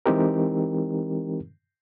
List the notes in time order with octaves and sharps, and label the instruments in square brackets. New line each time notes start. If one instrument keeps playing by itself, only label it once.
[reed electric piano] E3 G#3 C4 D#4 G4 A#4